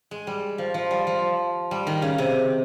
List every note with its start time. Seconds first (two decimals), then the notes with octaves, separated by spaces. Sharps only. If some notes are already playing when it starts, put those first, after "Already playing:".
0.11 G#3
0.27 G3
0.58 F3
0.74 F3
0.91 G3
1.07 F3
1.71 G3
1.87 D#3
2.02 C#3
2.18 C3